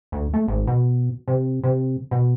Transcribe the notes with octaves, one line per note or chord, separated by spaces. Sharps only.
D2
A3
G#1
B2
C3
C3
B2